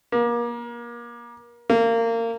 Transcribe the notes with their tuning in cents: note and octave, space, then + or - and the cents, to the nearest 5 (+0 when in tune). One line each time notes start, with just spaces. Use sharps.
A#3 +30
A#3 -25